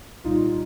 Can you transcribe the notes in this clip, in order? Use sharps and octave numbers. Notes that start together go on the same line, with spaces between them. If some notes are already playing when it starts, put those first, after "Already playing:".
C2 A#2 G3 D#4 F4